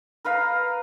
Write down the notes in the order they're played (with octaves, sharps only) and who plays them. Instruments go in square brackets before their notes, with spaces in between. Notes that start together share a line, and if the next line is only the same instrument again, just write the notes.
[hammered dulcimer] A#4 B4 F5 A#5